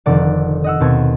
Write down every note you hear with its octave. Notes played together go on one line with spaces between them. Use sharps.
F1 D3 D#3 A4 D5 F#5
D#5 F#5 E6
D#2 B2 B3 C4 A5 G#6